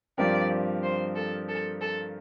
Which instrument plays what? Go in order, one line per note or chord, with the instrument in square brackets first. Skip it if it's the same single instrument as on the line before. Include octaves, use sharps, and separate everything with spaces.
[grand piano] G2 F3 C4 G4 A#4 [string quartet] D5
[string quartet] C5
A4
A4
A4